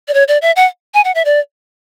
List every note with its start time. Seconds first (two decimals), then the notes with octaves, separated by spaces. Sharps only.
0.08 D5
0.14 C#5
0.28 D5
0.42 E5
0.56 F#5
0.94 G#5
1.05 F#5
1.15 E5
1.25 D5